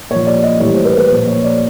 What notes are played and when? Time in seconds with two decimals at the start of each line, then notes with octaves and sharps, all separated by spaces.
0.10 A#2 C#5
0.15 F3
0.27 D5
0.43 D#5
0.60 A2 E3 G3 C#5
0.73 C5
0.85 B4
0.98 B4
1.11 A#2 F3 C5
1.28 C#5
1.44 D5